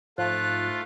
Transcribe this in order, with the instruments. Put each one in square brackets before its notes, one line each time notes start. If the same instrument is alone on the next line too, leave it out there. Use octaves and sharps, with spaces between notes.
[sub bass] G#2 [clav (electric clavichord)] F3 [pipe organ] A3 F4 [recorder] F#6